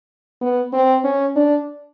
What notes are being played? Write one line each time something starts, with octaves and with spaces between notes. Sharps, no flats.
B3
C4
C#4
D4